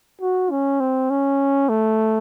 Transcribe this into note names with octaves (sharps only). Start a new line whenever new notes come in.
F#4
C#4
C4
C#4
A3